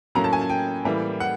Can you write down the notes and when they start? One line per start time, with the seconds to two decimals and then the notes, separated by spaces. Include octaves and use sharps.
0.15 A2 F#3 A#3 C#4 A#5
0.24 A5
0.33 G#5
0.41 A5
0.50 G5
0.85 A2 E3 G3 A#3
1.20 F#5